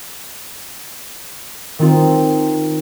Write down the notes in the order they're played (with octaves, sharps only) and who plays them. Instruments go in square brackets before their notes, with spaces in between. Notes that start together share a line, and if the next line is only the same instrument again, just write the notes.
[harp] D#3 C4 D#4 F4